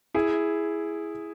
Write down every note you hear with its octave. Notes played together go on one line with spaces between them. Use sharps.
E4 G#4